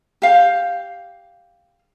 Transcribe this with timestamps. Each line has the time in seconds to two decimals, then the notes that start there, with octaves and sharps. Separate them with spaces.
0.22 G4 F5